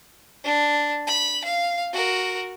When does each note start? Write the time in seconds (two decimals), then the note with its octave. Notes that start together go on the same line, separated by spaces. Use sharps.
0.44 D4
1.07 B5
1.44 F5
1.93 F#4 A#4